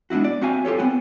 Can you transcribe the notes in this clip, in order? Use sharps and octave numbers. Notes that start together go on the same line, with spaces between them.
G#3 B3 D4 E4 F#4
D5
C4 F#4 E5 F5 G#5
F4 G4 A4 C#5
B3 C4 F#5 G#5